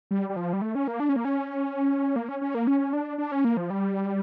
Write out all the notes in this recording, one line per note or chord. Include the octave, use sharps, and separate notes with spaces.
G3
G3
F3
G3
A3
C#4
A#3
D4
C#4
A#3
C#4
A#3
C#4
C#4
A#3
C#4
D4
D4
C#4
A#3
F3
G3